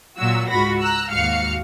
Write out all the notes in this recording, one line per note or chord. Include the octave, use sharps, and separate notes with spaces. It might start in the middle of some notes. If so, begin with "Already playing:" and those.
A#2 F#3 F#4 E6
C#2 G#2 F4 F#4 B5 A#6
A#5 E6 F#6
D#2 G#2 F#4 F5 F6 C#7